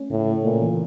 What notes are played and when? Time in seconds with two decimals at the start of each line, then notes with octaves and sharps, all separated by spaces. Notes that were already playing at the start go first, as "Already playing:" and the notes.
Already playing: A3 C#4
0.10 A2 C#3
0.27 A3
0.44 A#2 A3
0.61 E3